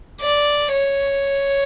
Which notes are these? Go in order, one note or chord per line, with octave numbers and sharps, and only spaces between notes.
D5
C#5